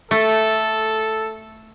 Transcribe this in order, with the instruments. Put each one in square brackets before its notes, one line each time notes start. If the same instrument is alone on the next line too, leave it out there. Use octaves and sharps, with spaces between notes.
[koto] A3 [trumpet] A4